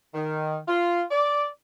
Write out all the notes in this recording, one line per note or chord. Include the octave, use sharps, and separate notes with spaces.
D#3
F4
D5